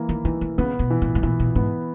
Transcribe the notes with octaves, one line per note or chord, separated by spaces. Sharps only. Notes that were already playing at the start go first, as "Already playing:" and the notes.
Already playing: E3 A#3
D#3
D#3 E3
C#3
C#3 B3
B2
E3
A#2
G#2
A#2 E3
A#2
G#2 B3